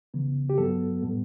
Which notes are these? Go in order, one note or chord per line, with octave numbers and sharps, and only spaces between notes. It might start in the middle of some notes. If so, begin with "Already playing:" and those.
C#3 E3 B3
G4
G2 F#3 B3 A4
A2 G3 B3